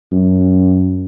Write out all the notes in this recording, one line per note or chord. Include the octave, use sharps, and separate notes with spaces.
F#2